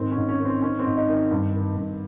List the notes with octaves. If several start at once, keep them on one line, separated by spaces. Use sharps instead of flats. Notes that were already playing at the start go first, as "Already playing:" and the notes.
Already playing: G#2 D#3 C4
C#4
G#2
C#4
D#3
C4
D#3 C#4
C4
G#2
D#4
D#3
G4
G2
D#3
G2